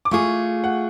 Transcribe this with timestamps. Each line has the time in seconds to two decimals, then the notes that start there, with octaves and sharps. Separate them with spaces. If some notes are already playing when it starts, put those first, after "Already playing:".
0.05 D6
0.11 A3 F4 G#4 C#6
0.64 F#5